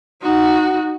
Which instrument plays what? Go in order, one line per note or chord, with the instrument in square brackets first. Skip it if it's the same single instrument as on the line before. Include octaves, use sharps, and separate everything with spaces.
[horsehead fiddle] D#4 F#4